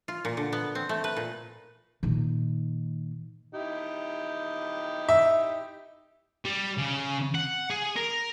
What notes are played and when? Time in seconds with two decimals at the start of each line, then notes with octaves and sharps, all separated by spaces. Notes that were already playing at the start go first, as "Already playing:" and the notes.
0.08 F4
0.25 A#2
0.37 D3
0.53 B3
0.75 C4
0.89 A3
1.04 B4
1.17 A#2
2.03 A#2 D#3
3.54 D#4 E4 G4
5.09 E5
6.45 G3
6.78 C#3
7.35 F#5
7.70 G#4
7.96 A#4